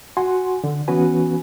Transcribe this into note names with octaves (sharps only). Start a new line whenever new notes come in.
F#4 F#5 G#5 C6
D3
E3 B3 C#4 F#4 B4 G#5